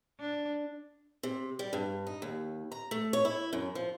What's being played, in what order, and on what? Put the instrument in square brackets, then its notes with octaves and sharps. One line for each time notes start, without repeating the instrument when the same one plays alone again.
[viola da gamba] D4
[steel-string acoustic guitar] C3
G3
G2
D#4
D#2
A#5
A3
C#5
E4
F#2
F3